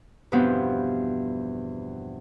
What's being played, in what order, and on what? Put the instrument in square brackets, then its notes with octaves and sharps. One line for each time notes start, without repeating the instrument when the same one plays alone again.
[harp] E2 G2 B2 F3 B3 C4